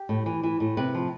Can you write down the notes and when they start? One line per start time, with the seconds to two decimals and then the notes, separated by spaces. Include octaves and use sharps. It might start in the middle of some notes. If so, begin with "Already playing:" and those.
Already playing: G4
0.09 A2
0.26 E3
0.43 E3
0.60 A2
0.77 C3 B4
0.94 F3